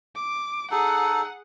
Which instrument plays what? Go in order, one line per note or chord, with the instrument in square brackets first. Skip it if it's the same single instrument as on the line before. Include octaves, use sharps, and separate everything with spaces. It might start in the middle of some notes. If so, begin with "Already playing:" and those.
[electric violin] D6
[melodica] D#4 A4 [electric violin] G#4 F#5